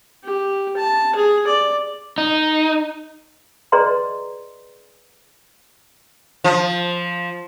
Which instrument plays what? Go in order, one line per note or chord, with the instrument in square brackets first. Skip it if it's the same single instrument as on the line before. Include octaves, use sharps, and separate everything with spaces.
[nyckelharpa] G4
A5
G#4
D5
[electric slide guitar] D#4
[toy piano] G#4 B4 D5 D#5 A#5 C6
[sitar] F3